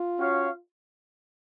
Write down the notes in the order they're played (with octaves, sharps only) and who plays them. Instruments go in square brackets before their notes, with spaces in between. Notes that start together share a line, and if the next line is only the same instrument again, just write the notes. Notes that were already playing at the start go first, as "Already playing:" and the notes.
Already playing: [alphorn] F4
[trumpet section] C#4 F#4 C#5 F5